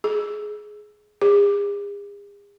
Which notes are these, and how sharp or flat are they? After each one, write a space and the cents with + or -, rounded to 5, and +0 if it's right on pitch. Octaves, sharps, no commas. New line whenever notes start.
G#4 +15
G#4 -40